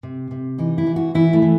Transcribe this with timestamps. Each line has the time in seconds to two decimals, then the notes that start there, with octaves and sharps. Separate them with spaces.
0.03 C3
0.31 C3
0.58 E3 D#4
0.78 E4
0.87 E3
0.96 F#4
1.14 E3 E4
1.33 A3
1.42 E3